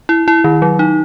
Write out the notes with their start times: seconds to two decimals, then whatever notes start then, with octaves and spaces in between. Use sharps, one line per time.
0.09 E4
0.28 E4
0.44 D#3
0.62 F#3
0.79 D#4